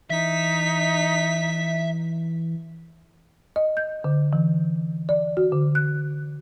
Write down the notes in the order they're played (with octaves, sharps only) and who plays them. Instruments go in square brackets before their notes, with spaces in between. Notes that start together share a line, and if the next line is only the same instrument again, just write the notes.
[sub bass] E3 [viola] D#4 [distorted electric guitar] E5 [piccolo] B6
[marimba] D#5
G6
D3
E3
D5
F#4
D3
F#6